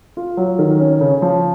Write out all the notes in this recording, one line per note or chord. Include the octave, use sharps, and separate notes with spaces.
F4
F#3
D#3
C#4
C#3
F3